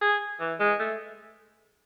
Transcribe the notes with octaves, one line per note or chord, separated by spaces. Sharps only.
G#4
E3
G#3
A3